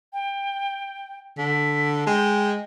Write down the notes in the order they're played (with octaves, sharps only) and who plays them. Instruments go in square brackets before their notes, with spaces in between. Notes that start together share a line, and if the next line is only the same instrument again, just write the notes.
[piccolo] G5
[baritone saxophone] D3 [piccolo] B6
[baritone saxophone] G#3 [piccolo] G5